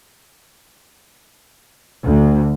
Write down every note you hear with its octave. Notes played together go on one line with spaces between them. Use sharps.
D2